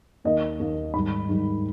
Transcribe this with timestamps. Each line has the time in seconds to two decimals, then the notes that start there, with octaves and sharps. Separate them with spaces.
0.24 D#2 D#3 A#3 D#5
0.60 D#2 D#3 A#3
0.94 G#2 D#3 G3 B5
1.29 G#2 D#3 G3